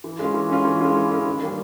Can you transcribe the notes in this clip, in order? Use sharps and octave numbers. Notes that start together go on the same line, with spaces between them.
E3
G#3 C#4 F4
E3
G#3 C#4 F4
E3
G#3 C#4 F4
E3
G#3 C#4 F4
D#3
G3 A#3